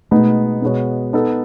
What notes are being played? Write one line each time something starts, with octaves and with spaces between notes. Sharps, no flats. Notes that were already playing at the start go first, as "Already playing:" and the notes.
B2 G#3 A3 B3 D#4
B2 G#3 B3 F#4 C#5
B3 D#4 A4